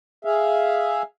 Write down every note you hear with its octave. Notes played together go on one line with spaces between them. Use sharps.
G#4 E5 F5